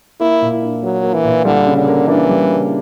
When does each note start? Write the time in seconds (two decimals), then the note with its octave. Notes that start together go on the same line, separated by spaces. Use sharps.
0.20 A#3 E4
0.41 A#2
0.62 D4
0.83 F#3 A#4
1.03 A#3
1.14 E3
1.24 A#2
1.45 D3 G3
1.67 C#3
1.78 D3
1.87 A#3
2.08 E3 D4
2.29 G3
2.50 C#3